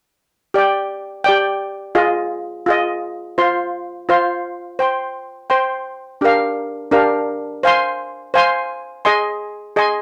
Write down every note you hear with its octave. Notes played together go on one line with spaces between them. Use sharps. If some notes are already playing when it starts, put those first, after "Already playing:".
G4 D5 G5
G4 D5 G5
F4 G#4 D#5
F4 G#4 D#5
F4 C5 F5 C6
F4 C5 F5 C6
C5 G5 C6
C5 G5 C6
D4 G4 A#4 F5
D4 G4 A#4 F5
C5 F5 G#5 C6
C5 F5 G#5 C6
G#4 D#5 G#5 C6
G#4 D#5 G#5 C6